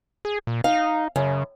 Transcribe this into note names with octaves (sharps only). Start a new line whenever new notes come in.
G#4
A#2
D#4 F5
F#2 C#3